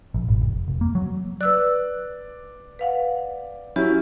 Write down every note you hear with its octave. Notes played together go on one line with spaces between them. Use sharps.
A#1
G#1
F1
F1
A#3
F#3
B4 D5 E6 F#6
B4 F5 F#5
F#3 C#4 E4 G4